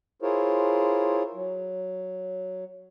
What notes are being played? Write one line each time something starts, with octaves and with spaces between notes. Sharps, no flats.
E4 F4 G#4 A#4 C5 C#5
F#3